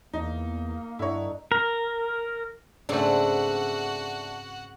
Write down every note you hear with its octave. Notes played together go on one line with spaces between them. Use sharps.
E2 A#3 D#4
G2 D3 D#4 E4 C#5
A#4
G#2 C#3 A3 C4 D4 F#4 F#5